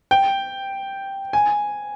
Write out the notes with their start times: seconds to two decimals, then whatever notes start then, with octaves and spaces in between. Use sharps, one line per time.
0.11 G5
1.33 G#5